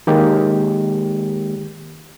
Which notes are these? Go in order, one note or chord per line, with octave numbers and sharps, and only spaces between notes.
D#3 G#3 A#3 G4